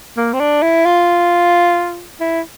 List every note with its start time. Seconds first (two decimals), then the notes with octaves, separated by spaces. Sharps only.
0.17 A#3
0.33 C4
0.40 D4
0.62 E4
0.86 F4
2.20 E4